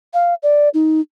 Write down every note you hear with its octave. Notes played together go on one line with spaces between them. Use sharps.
F5
D5
D#4